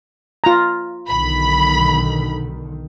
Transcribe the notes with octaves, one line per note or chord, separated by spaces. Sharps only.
F4 A#5
B1 D3 D#3 B5